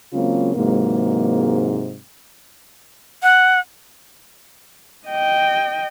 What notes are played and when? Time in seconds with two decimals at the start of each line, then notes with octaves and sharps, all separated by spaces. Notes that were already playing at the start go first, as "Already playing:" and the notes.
0.14 C#3 F#3 G#3 A#3 C4 F4
0.55 G#2 C3 E3 F#3 G#3 A#3
3.23 F#5
5.07 D#5 G5